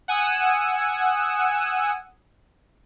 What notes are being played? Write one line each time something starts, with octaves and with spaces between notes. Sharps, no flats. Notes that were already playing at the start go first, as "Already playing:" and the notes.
F#5 G#5 D#6 E6